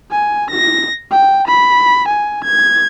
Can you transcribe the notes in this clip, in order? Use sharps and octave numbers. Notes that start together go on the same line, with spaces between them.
G#5
A#6
G5
B5
G#5
G#6